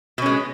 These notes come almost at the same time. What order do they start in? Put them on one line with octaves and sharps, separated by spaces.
B2 C#4 G#3